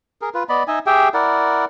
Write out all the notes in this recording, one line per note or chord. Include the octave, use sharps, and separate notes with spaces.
G#4 A#4
F4 B4
B3 D5 D#5 B5
D#4 D#5 E5 G#5
G4 G#4 E5 G5
E4 A#4 D5 F#5